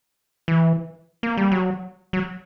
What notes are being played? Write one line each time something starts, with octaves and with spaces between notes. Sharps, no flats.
E3
A#3
G3
F#3
F#3